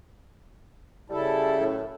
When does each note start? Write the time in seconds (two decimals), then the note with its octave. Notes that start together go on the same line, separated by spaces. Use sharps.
1.10 C#3 G3 E4 A4
1.60 F#2 A2